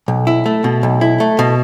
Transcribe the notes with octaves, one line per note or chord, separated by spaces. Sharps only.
B1
E4
A3
B2
B1
E4
A3
B2